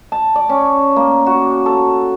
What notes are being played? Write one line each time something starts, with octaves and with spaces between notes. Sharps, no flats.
A5
D5
C#4
A#3
F#4
A4